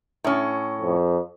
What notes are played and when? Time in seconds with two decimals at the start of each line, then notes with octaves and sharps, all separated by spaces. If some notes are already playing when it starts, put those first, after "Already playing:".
0.24 A2 C#4
0.82 F2